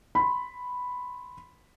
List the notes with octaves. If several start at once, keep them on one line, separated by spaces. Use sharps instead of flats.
B5 C6